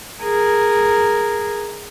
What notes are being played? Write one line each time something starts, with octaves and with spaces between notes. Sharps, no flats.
G#4 A#4